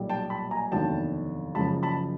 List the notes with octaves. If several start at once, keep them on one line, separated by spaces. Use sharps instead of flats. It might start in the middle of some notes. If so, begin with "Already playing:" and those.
Already playing: B1 A#2 G3
G5 A5
A5 B5
G#5 A#5
F1 D#2 D3 F#3 B3 G5 A5
F#1 F#2 C#3 F3 A5 B5
A5 B5